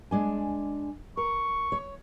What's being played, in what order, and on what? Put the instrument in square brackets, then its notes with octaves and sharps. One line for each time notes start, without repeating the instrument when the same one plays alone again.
[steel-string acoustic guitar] G#3 D4 G#5
[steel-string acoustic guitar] A#4 [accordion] C#6
[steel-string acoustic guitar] C#5